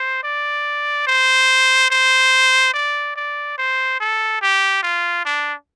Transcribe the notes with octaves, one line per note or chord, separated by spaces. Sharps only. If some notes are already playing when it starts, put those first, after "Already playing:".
Already playing: C5
D5
C5
C5
D5
D5
C5
A4
G4
F4
D4